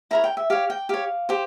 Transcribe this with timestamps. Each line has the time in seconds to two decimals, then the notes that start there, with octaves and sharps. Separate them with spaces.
0.11 E4 A#4 C#5 A#5
0.24 G5
0.37 E5
0.50 G4 C#5 F5
0.70 G5
0.89 G4 C#5 F5
1.29 G4 C5